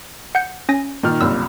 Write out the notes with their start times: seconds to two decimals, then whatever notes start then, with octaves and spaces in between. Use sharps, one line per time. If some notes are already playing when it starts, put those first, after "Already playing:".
0.35 F#5 G6 C#7
0.69 C#4 G#5 A#6
1.03 A#2 D#3 F6
1.21 F#1 C2 A#2 E6